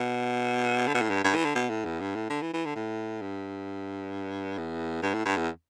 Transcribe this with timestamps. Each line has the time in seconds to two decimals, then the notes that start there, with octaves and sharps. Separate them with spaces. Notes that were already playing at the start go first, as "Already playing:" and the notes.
Already playing: B2
0.88 D3
0.94 B2
1.02 A2
1.10 G2
1.25 G2
1.35 E3
1.45 D3
1.55 B2
1.70 A2
1.85 E2
2.01 G2
2.16 A2
2.30 D3
2.42 E3
2.54 E3
2.65 D3
2.76 A2
3.22 G2
4.58 E2
5.03 G2
5.14 A2
5.26 G2
5.37 E2